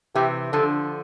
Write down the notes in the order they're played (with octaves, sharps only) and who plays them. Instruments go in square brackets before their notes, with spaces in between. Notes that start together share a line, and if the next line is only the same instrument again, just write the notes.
[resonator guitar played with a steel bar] C3 E3 [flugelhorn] G4
[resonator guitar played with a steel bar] D3 F3 [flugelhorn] A4